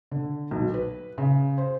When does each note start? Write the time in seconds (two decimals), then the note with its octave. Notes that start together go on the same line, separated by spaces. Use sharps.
0.11 D3
0.51 B1
0.74 B4
1.18 C#3
1.58 C5